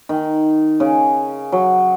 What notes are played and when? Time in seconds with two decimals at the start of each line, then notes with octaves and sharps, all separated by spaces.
0.09 D#3
0.80 C#3
1.52 F#3